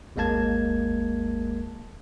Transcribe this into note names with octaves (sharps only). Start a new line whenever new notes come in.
G#1 D#2 G#3 A#3 A5 G#6